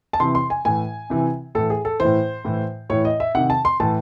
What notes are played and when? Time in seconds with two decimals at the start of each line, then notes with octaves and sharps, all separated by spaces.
0.13 A5
0.20 C3 E3 C6
0.35 C6
0.50 G#5
0.65 A2 E3 G#5
1.10 C3 E3
1.55 A2 E3 A4
1.70 G#4
1.85 A4
2.00 A2 E3 C5
2.45 A2 E3
2.90 A2 E3 C#5
3.05 D#5
3.20 E5
3.35 C3 D#3 F#5
3.50 A5
3.65 C6
3.80 A2 E3 A5